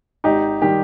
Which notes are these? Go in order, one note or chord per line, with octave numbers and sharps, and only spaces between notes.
G#1 D#4 G4
D#3 G3 G4